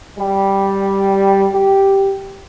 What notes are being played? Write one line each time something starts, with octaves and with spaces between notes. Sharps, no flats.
G3
G4